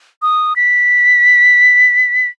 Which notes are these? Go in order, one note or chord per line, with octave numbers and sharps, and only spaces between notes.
D#6
B6